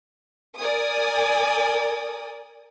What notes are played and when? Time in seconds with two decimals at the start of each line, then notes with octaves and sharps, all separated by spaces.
0.57 A#4 D5 G#5 D#6